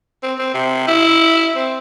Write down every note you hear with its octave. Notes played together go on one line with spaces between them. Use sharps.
C4
C4
C3
E4
C4